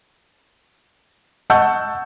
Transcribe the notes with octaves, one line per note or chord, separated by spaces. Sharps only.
D#5 F#5 A5 C#6 E6 G6